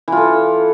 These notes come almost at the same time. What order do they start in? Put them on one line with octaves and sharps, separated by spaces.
E3 F4 A4